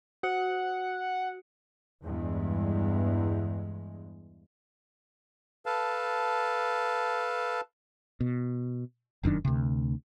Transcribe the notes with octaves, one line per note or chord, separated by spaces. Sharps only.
F#4 F#5 C#7
E2 G2 G#3
A4 B4 F5 A5
B2
F1 F#2 D#3 D4
D2 C3